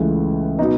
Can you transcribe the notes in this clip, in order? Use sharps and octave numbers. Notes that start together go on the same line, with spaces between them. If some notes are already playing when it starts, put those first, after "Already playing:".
Already playing: C#2 C#3 E3 A3
B2 F#3 B3 D#4